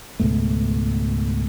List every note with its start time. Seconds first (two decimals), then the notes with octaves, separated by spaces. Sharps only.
0.20 C#2 G#2 B2 A3